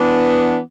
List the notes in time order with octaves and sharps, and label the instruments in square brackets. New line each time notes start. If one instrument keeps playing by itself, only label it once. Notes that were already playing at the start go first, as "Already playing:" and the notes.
Already playing: [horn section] E3 B3 D4